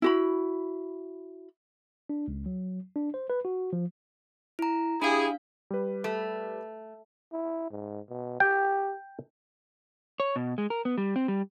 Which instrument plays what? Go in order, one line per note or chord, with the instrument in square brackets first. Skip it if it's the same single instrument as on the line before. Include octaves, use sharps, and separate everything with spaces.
[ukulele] E4 F#4 B5
[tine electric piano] D4
C#2
F#3
D4
C5
B4
F#4
F3
[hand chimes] E4 A#5
[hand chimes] D4 F5 [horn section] E4 G4 G#4
[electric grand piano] G3 B4
[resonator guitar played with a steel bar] A3
[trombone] E4
G#2
B2
[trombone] G4 [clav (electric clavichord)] G5
[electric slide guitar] C#5
B2
G#3
A#4
B3
G3
C4
G3